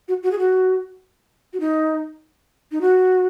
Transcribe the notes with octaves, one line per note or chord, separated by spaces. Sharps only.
F#4
F#4
G#4
F#4
F#4
D#4
D#4
F#4